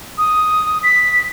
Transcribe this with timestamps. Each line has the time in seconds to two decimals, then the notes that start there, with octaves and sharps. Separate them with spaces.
0.18 D#6
0.83 B6